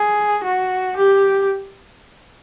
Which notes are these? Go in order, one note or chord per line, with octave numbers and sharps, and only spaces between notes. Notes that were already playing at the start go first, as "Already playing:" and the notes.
Already playing: G#4
F#4
G4